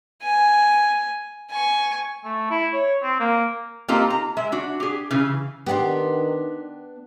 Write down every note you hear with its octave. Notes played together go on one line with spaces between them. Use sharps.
G#5
G#5 C#6
A3
E4
C#5
C4
A#3
A#3 C4 D#4 F4 G4 A4
A#5
G#3 E5
D4 F#4
G4 G#4
C#3 E3
D#3 B3 D4 G4 D5 C6